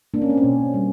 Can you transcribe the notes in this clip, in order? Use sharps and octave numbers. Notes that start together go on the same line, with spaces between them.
A#3 D4
C#4
C4
C#4
B2
G3